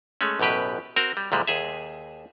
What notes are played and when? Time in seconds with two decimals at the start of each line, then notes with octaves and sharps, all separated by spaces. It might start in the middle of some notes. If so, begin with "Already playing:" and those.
0.21 G#3 A3 C#4
0.39 A1 F#2 B2 G4 B4
0.96 C4 F#4 A#4
1.17 G3
1.32 D2 A#2 G3 G#3
1.47 D#2 G#4 E5